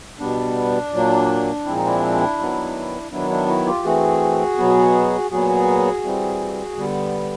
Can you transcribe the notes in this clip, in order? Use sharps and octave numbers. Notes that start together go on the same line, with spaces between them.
B2 G3 B3 D4
A#2 F#3 A#3
A#2 F3 G#3 C4 E4
D#4
D4 E4
D#3 F#3 B3
D#3 F#3 B3 D4 E4
D4 E4
E4 F#4
F4 G4
E3 A3 C4 F#4 G#4
B2 F#3 B3
A#2 F#3 B3 F#4 G#4
E3 G3 C4
D3 G3 B3